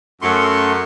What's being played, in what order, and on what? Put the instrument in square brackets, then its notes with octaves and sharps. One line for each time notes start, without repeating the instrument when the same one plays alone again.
[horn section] F#2 [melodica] A3 C6 C#6